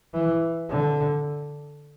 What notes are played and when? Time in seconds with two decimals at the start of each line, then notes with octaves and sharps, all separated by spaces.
0.14 E3
0.70 D3